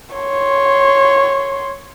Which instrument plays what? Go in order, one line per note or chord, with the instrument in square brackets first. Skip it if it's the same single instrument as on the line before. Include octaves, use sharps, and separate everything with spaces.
[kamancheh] C#5 C6